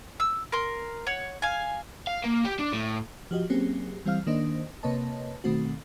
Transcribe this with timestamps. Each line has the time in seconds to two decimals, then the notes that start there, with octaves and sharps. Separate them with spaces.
0.20 E6
0.52 A#4 C6
1.07 C#5 F#5
1.42 F5 G#5
2.07 F5
2.24 A#3
2.45 G4
2.59 D4
2.73 A2
3.31 F3 F#4 G4 D#5
3.50 F#3 A#3 C4 C#4 G4 G#4
4.05 E3 G3 C4 F5 F6
4.27 D#3 A#3 D4 C5 D#5
4.83 C3 A#3 B4 C#5 D#5 A5
5.44 B2 D#3 A3 C4 F#4